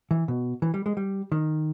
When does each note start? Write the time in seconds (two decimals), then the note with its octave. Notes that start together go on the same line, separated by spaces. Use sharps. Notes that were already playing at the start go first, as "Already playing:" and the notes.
0.11 E3
0.28 B2
0.62 E3
0.74 G3
0.86 G#3
0.97 G3
1.32 D#3